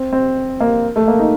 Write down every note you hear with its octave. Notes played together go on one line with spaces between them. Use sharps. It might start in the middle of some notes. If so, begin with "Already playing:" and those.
Already playing: C4
C4
A#3
A3
A#3
D#4